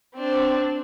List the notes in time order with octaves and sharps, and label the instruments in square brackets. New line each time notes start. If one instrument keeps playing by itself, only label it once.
[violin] C4 D4